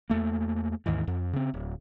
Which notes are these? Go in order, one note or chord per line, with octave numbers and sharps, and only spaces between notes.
E2 A3 A#3
D#2 G#2 D#3 E3
F2
C#3 C4
D1